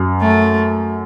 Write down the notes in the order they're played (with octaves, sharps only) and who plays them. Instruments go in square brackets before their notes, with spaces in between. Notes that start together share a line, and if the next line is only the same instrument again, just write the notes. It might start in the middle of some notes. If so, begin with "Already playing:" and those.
Already playing: [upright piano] F#2
[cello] A3